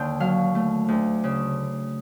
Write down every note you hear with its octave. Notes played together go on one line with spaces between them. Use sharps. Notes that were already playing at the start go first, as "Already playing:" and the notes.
Already playing: D#2 D3 G5
F#3 F5
A3
D2
C#3